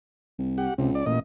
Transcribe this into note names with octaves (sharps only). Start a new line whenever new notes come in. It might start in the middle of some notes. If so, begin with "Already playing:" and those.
C2
G4 F#5
C#2 C3
D5
A1 A#2 D#5